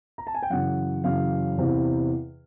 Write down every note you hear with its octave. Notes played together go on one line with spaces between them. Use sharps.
A#5
A5
G#5
G5
F#2 C#3 E3 F#5
F#2 C#3 E3 F5
E2 C3 E3